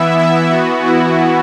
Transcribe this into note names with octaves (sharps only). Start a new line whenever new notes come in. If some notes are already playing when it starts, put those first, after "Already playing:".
Already playing: E3 B3 E4 E5
E4 E5
E3 B3 F#4
E4